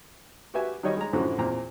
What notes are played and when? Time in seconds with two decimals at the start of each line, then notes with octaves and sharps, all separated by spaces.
0.54 F#4 G4 B4 E5 G#5
0.83 D#3 F#3 G3 C#5 D#5
0.97 G#3 A#5
1.13 F#2 A2 D3 E3 F3 F#4
1.38 E2 A#2 C4 A#5